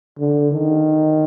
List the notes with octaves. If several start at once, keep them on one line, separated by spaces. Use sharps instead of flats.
D3
D#3